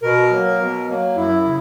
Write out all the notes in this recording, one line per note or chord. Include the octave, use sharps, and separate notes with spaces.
B2 A#4
F#3 A#3
B2
F#3 A#3
F#2 E4
C#3